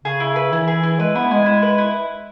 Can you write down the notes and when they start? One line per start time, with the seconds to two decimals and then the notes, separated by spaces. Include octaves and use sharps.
0.04 C#3 G#4
0.20 E4
0.36 B4
0.52 E3 E4
0.68 G#4
0.83 E4
0.99 G#3 B4
1.15 B3 E4
1.31 G#3 G#5
1.46 E4
1.62 B4
1.78 E4